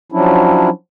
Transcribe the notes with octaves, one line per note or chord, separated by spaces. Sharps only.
F3 F#3 C#4 D4 E4